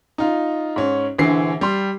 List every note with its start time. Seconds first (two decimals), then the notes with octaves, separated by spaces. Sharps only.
0.18 D#4 F4
0.76 G#2 C#4
1.18 A#1 D3 E3 C7
1.61 G3 C6